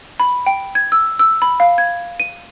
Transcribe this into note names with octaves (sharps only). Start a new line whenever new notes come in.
B5
G5
G#6
E6
E6
B5
F5
G#6
D#7